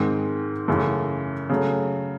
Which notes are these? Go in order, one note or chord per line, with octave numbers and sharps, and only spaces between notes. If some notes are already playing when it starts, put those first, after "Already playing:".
Already playing: G#2 D#3 G#3 C4
F#2 C#3 E3 A3
C#3 F#3 A3